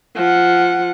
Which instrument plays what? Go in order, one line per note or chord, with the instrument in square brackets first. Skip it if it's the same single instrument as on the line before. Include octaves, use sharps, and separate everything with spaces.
[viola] F3 F#5